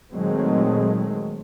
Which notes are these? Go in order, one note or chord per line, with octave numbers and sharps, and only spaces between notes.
A#2 D#3 F#3 G#3 A3 C4